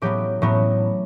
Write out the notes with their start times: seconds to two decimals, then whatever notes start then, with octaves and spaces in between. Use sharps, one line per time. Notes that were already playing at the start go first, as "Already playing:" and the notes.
0.02 A2 F#3 B3 G4
0.42 A2 F#3 B3